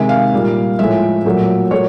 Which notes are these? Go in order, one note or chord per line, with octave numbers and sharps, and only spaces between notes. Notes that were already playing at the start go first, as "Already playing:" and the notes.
Already playing: C3 D#3 G#3 E5
F5
A#2 G3
A2 F3 G#3 E5
A#2 F#3 A3
A#2 F#3 A3 C#5